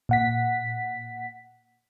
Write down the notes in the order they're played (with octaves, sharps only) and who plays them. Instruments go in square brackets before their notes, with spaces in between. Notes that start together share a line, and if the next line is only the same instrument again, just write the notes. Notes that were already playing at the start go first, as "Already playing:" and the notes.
[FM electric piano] A#2 F#5 B6